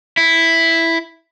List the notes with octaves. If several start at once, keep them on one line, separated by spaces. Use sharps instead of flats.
E4